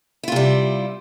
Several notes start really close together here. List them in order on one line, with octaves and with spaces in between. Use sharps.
E4 F4 C3 G3